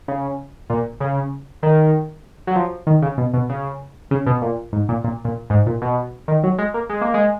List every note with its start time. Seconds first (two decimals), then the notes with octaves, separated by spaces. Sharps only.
0.08 C#3
0.70 A#2
1.00 C#3
1.63 D#3
2.47 F#3
2.56 F3
2.87 D#3
3.02 C#3
3.18 B2
3.33 B2
3.49 C#3
4.11 C#3
4.26 B2
4.42 A#2
4.72 G#2
4.89 A#2
5.04 A#2
5.25 A#2
5.50 G#2
5.66 A#2
5.82 B2
6.28 D#3
6.43 F#3
6.58 G#3
6.74 A#3
6.89 G#3
7.01 A#3
7.14 G#3